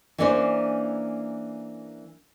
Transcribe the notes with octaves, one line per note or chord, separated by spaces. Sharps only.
E3 A#3 C#4 D4 A#4 C5